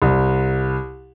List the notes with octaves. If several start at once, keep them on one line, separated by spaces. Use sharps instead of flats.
C2